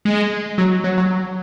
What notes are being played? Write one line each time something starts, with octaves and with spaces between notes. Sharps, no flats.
G#3
F#3
F#3
F#3